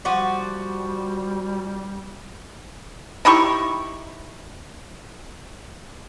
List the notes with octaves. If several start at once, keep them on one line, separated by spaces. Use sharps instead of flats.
F3 G3 F#4 D5
D#4 E4 G4 C#6